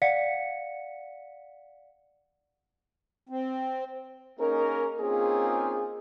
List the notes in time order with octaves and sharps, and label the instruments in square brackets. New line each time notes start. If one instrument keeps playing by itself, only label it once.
[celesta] D5 F5 F#5 B6 C#7
[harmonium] C4
[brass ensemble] A#3 C#4 D#4 G#4 A#4
A#3 C4 C#4 D#4 F4 G#4